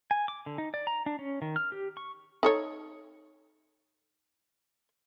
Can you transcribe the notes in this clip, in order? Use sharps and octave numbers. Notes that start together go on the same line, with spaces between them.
G#5
D6
D3
D#4
D5
A#5
D4
C#4
D#3
F6
G4
C#6
D#4 A4 C#5